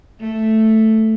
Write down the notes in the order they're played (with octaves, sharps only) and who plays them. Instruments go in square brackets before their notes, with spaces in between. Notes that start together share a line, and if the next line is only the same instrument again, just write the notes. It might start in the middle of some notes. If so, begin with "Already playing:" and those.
[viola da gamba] A3